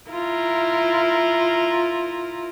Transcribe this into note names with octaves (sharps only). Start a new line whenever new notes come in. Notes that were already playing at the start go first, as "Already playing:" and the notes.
E4 F4 A#4